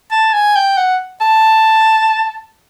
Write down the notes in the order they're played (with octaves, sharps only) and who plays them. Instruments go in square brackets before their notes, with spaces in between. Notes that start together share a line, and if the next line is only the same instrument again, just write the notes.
[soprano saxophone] A5
G#5
G5
F#5
A5